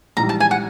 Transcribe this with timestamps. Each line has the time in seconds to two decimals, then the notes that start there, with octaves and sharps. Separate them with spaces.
0.17 A#1 G#2 E3 G3 A#5
0.29 A5
0.40 G#5
0.51 F#5